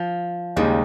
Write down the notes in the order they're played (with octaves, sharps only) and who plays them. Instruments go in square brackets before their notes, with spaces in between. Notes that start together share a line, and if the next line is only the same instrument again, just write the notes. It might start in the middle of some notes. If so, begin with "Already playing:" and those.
Already playing: [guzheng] F3
[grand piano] D#2 C#3 G#3 D#4 [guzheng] G3